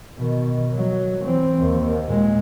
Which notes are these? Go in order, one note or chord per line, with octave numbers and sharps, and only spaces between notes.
B2 D#3
F#3
E3 C4
D#2
A#2 G#3